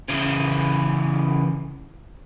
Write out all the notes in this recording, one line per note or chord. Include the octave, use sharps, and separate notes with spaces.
C#3 E3